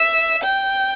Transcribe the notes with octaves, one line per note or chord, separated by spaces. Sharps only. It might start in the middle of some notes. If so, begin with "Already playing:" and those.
Already playing: E5
G5